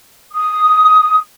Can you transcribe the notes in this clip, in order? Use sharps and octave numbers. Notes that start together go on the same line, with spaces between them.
D#6